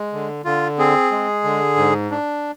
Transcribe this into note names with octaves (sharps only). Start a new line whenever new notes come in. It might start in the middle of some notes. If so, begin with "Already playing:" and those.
Already playing: G#3
D3
D3 F4
C4 G#4
G#3
D3
G#2
D4